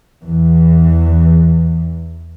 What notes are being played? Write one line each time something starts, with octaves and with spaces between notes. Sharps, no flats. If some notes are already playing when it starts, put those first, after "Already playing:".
E2 E3